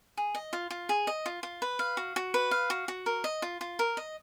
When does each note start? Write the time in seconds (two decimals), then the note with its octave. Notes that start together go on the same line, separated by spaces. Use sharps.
0.17 G#4
0.35 D#5
0.53 F4
0.70 F4
0.89 G#4
1.07 D#5
1.26 F4
1.43 F4
1.62 B4
1.79 F5
1.97 F#4
2.16 F#4
2.34 B4
2.51 F5
2.70 F#4
2.88 F#4
3.06 A#4
3.24 D#5
3.42 F4
3.61 F4
3.79 A#4
3.97 D#5